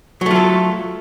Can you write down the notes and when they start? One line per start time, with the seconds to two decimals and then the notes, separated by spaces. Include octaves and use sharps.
0.21 F#3
0.26 A3
0.31 F4
0.36 A4